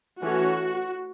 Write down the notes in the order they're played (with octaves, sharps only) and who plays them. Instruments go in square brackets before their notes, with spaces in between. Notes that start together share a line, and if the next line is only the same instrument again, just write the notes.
[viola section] E3 A3 C#4 F#4